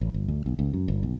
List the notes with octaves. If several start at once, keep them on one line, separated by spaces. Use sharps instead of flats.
A1
G1
D2
B1
C#2
F#2
G1
B1